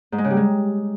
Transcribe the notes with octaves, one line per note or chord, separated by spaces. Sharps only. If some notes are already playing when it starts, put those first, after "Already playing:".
G#2
G#3
C#3
G3
G#3